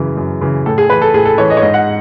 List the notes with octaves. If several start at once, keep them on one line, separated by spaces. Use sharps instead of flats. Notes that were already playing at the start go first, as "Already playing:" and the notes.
Already playing: F#2 C#3 E3
F#2
C#3 E3
A2 A4
G#4
E3 B4
A4
A2 G#4
A4
E3 C#5
D#5
C#5
G#2 D#5
F#5